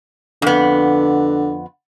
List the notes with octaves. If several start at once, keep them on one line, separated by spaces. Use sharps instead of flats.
F2 D3 B3